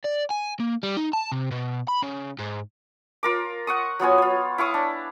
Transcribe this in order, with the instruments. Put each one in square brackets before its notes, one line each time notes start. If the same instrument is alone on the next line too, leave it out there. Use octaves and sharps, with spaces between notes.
[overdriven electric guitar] D5
G#5
A#3
G3
D#4
A5
C3
B2
B5
C#3
G#2
[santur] F4 A#4 D6
F#5 C#6 D#6
F#3 B3 F4 G#5
F4 C#5
E4 F5 C#6 D#6
D4